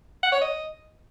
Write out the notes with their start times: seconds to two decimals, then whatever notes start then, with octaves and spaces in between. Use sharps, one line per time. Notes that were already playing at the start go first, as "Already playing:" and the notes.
0.23 F#5
0.32 C#5
0.41 D#5